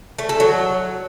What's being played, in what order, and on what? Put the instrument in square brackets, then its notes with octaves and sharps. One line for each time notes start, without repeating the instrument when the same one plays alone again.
[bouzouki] A3
A4
F#3